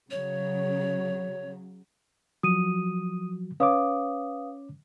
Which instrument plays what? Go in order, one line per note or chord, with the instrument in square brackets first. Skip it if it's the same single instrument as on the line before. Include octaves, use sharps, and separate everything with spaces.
[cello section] C#3 F#3 [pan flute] C#5
[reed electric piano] F3 F#3 F#4 [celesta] D#6 D#7
[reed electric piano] C#4 C#5 D6 [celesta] B4 F5 D#6